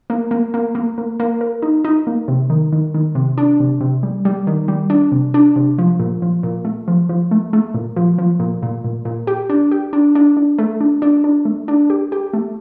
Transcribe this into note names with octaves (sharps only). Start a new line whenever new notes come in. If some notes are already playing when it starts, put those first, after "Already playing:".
A#3
A#3
A#3
A#3
A#3
A#3
A#4
D#4
D#4
A#3
C3
D#3
D#3
D#3
C3
D4
C3
C3
G3
G3
D#3
G3
D4
C3
D4
C3
F3
A#2
F3
A#2
A3
F3
F3
A3
A3
A#2
F3
F3
A#2
A#2
A#2
A#2
G4
D4
G4
D4
D4
D4
A3
D4
D4
D4
A3
D4
G4
G4
A3